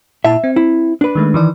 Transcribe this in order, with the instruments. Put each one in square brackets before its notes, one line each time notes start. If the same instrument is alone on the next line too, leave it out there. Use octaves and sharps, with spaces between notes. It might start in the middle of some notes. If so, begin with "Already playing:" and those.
[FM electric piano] A#2 E4 A5 [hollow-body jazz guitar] E5
[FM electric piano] C4
[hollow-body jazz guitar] E4
D4 B4
[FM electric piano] D#3 G#3 A3
D#3 E3 D5